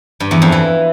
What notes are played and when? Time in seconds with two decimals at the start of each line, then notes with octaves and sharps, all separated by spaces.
0.20 G2
0.31 E2
0.42 F2
0.52 E3